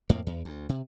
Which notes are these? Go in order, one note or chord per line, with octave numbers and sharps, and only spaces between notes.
F2 A2 A#3
E2
D2
C3